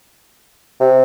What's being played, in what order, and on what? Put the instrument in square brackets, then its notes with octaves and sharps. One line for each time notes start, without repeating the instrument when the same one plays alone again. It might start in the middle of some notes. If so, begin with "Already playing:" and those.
[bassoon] C3